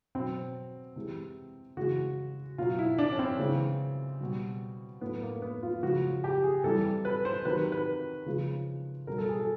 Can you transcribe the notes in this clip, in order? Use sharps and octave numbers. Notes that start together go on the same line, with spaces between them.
B2 F#3 C4
C3 E3 G#3
C#3 E3 G#3 F#4
B2 F#3 F4
E4
D4
C#4
C4
C#3 E3 G#3
B2 G3
A2 F#3 B3
A#3
B3
F4
C#3 F3 G#3 F#4
G4
G#4
C3 E3 G3 A4
B4
C5
C3 D#3 F#3 B4
B4
C#3 F3 G#3
B2 G3 A#4
A4
G#4
A4